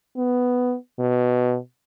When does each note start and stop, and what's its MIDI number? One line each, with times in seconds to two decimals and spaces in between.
0.17 0.75 59
1.00 1.57 47